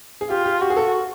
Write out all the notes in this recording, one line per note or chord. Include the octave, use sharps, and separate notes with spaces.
G#4
F4 G4
G4
F#4 G4
G#4
A4